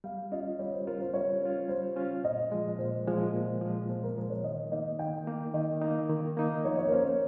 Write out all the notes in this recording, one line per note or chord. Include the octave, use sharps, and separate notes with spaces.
G3 F5
C#4 F4 D#5
G3 C#5
C5
C#4 F4 A#4
C5
G3 C#5
C#4 F4
G3 C5
C#4 F4
A#2 D#5
F3 G#3
A#2 C5
F3 G#3
A#2
F3 G#3
A#2 C5
A#4
F3 G#3 C5
C#5
D#3 D#5
A#3 D#4 D#5
D#3 G5
A#3 D#4
D#3 D#5
A#3 D#4
D#3
A#3 D#4
F3 C#5
C#5
A#4
A#3 C#4 C5
C#5